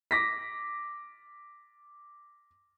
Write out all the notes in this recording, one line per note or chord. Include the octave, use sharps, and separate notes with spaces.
D6 A#6 B6